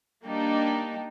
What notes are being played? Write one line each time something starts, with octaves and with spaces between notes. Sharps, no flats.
G3 A#3 D4 D#4 G4